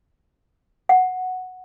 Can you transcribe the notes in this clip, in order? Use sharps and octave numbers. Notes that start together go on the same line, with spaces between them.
F#5